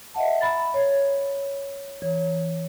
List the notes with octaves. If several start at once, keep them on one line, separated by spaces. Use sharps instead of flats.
D#5 E5 F#5 A5
A#5 B5 A6
C#5
E3 C#5